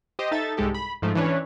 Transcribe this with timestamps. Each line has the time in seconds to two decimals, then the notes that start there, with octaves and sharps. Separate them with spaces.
0.19 G4 C5 D#5
0.31 D#4 A4 E5 A6
0.57 C2 G#2 G#3 G4 A4
0.74 B5
1.02 G#2 F3 A3
1.15 E3 C#4 D4 B4 C#5